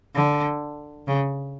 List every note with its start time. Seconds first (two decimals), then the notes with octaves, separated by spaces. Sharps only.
0.15 D3
1.07 C#3